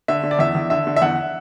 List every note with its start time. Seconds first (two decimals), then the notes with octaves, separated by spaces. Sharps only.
0.08 D3 E5
0.23 D3
0.31 D5
0.39 E2 E5
0.55 E2
0.70 D3 E5
0.87 D3
0.96 E5
1.02 E2 F#5